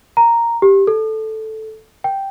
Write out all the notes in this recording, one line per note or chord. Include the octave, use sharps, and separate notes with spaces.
A#5
G4
A4
G5